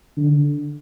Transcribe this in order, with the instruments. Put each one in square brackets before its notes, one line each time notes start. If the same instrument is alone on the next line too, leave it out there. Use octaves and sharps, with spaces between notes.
[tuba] D3